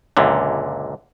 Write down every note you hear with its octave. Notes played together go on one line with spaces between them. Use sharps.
C#2 F#2 A#2 D3